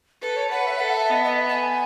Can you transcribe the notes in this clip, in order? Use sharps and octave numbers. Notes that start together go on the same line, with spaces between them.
A4 B4
C#5
B4 F#5
E5
A4 F#5
E5
B3 D#5
D#5
E5
A5
G#5